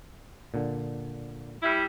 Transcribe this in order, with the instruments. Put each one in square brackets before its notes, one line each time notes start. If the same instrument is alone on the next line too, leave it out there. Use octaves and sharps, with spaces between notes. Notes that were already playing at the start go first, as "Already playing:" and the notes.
[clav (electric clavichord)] A#2 D3
[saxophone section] G3 E4